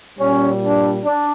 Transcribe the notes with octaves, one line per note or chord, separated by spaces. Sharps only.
A#2 G3 C#4
D4
D4